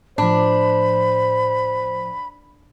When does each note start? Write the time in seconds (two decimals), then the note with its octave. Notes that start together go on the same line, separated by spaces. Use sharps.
0.18 A2 F3 D4 C5 B5